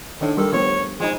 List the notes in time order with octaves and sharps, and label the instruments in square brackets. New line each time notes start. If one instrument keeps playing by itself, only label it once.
[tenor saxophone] A2 [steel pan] D#3 D4
[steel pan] G3 G4 A#4 [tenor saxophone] A4
[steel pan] F3 A3 B3 [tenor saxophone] C#5
[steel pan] F3 D#4 [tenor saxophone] G#3